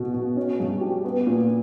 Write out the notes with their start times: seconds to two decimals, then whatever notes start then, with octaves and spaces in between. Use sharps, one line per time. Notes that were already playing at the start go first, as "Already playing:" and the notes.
Already playing: B2 B3
0.14 B2
0.37 C#4
0.60 G2
0.81 G4
1.05 B3
1.27 A#2